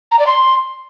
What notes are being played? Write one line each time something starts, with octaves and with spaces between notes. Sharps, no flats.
A#5
D5
C6